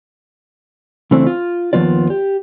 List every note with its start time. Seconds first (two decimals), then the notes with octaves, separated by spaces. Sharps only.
1.11 C#3 E3 A3 C4 D4
1.27 F4
1.73 D#2 C#3 F3 B3 F4 D5
2.10 G4